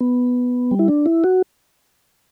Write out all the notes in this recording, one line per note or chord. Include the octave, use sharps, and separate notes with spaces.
B3
G3
E4
D4
E4
F#4